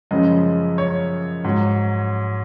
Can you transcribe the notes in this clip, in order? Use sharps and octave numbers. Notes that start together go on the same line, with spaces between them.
F#2 C#3 F3 G#3 D#5
C#5
G#2 F#3